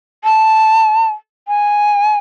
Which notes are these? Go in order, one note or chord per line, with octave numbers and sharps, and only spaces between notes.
A5
G#5